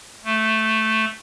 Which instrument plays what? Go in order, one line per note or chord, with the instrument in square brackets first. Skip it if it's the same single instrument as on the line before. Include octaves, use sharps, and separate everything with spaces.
[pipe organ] A3